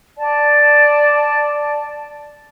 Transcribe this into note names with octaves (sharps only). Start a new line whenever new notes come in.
D5 A5